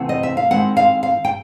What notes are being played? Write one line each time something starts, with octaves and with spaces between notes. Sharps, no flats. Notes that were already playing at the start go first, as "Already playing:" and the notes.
Already playing: C3 E3 A3 C4 E4 F#5
D#5
E5
F5
D#3 G#3 C4 E4 F#5
F5
F5
G5